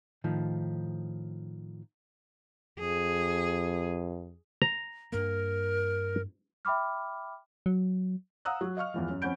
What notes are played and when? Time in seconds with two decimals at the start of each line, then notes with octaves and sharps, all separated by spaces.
0.24 A2 D#3 F3
2.80 F2 G#4
4.62 A#5
5.12 G2 A#3 A#4
6.65 E5 G5 B5 D6 F6
7.66 F#3
8.45 F5 F#5 A#5 D#6 E6 F#6
8.61 F#3
8.77 D#5 F5 C#6 F6
8.94 E2 E3 F3
9.09 F#2
9.22 F2 C#4 F#5 B5 G6 D7